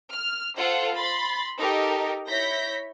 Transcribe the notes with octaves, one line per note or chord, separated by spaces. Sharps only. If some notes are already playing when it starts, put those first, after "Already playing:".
F6
F4 A4 C5 F#5
B5 C6 A6
D#4 G4 A4 A#4
E4 C#5 G6 A#6 B6